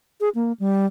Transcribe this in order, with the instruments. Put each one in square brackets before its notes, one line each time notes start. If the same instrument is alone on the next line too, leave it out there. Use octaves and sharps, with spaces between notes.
[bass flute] G#4
A#3
G3